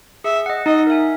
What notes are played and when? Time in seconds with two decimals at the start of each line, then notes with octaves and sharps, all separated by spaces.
0.24 G#4 E5
0.46 D#5 F#5
0.66 D#4 D#5
0.87 A#4 E5 G#5